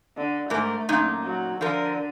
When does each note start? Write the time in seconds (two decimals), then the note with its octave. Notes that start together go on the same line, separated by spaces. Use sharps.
0.17 D3
0.50 G#2 A3 A#4
0.89 F#2 A#2 D#4
1.23 F#3
1.61 D3 F3 A#4